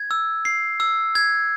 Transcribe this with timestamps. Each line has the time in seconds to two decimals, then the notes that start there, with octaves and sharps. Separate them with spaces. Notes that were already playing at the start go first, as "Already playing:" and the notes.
Already playing: G#6
0.11 E6
0.45 C7
0.80 E6
1.15 G#6